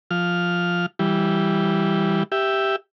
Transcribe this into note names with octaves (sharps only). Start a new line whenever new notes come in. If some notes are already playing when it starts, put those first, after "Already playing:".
F3 F6
E3 G3
G4 E5